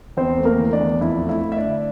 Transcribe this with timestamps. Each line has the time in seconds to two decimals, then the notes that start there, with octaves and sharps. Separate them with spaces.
0.17 E2 C4 C5
0.39 A3
0.45 A#3 A#4
0.59 E3
0.73 D4 D5
0.81 E2
1.01 F2 E4 E5
1.22 A3
1.29 E4 E5
1.43 A3
1.52 E5
1.57 D4 D5
1.64 D3